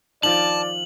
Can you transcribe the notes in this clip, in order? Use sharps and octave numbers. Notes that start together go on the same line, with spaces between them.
D#3 F3 D5 A5 F#7